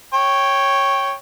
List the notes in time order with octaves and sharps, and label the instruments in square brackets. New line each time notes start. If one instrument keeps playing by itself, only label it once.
[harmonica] C#5 G5